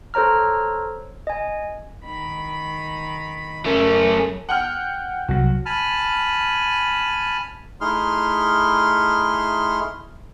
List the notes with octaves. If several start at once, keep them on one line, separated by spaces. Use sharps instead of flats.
A4 C5 C#5 A#5 F6
D#5 G#5
D#3 B5
F#2 C#3 A3 C#4 A#4
F#5 G5 F6
C2 F#3 F#4
G#5 A5 B5 F6
A3 D#4 E4 G#4 C6 F6